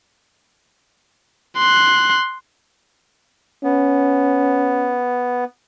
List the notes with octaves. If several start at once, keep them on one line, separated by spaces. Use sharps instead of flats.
C6 F#6
B3 C#4